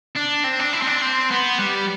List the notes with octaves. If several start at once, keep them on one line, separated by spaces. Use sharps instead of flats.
D4
C4
D4
E4
C4
D4
C4
B3
G3